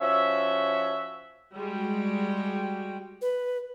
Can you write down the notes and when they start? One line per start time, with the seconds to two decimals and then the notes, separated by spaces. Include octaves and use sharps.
0.01 F3 C#4 F#4 E5
1.54 G3 G#3 F#4 G5
3.22 B4